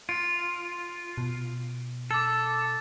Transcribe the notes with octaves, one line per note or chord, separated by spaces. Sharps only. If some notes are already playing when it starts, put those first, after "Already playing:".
F4 D7
B2
A4 D6 A6